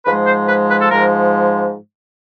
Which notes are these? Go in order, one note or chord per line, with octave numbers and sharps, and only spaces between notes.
G#2 F3 G#3 B4
C5
B4
B4
A4
G#2 F3 G#3 A#4